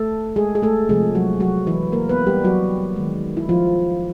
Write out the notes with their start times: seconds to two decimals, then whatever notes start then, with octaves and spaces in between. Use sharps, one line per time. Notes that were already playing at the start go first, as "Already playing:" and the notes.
Already playing: A3 A4
0.36 G#3 G#4
0.55 G#4
0.63 A3 A4
0.89 C3 F3 G#3 A3 G#4
1.15 F#3 F#4
1.40 F#3 F#4
1.67 E3 E4
1.92 A#3 A#4
2.09 B3 B4
2.27 G3 G4
2.44 F#3 F#4
2.96 D#3 G#3
3.37 E4
3.49 F3 F4